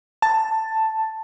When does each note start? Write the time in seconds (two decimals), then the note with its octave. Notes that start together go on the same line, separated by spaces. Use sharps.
0.22 A5